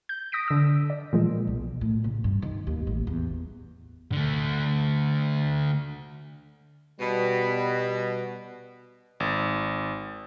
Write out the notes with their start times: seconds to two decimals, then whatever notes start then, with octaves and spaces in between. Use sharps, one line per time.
0.09 G6
0.32 D#6 A#6 B6 D7
0.48 D3 E6
0.90 D5
1.13 A#2 E3 F3 G#3
1.47 B1
1.81 A2
2.04 C#3
2.24 G2
2.42 D#3
2.67 D#2
2.87 A1
3.07 E2
4.12 D3 A3
7.00 B2 G3
9.20 G#1